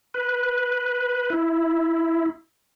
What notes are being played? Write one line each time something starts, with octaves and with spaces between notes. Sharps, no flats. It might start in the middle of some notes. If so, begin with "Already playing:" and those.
B4
E4